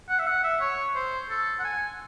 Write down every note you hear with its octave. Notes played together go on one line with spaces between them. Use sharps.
F#5
E5
F#5
E5
C#5
C5
A4
F#5
G#5